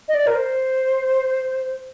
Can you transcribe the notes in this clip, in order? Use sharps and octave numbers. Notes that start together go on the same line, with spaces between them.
D#5
D5
A#4
C5